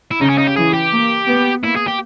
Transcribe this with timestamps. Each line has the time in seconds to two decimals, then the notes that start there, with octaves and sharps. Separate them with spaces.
0.11 E4
0.20 C#3 D#4
0.30 C#4
0.38 D#4
0.47 G4
0.57 E3 G#4
0.73 G4
0.92 A#3
1.27 B3
1.63 A#3 E4
1.76 G#4
1.87 G4